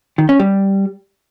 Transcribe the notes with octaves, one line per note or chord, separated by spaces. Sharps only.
D#3
C#4
G3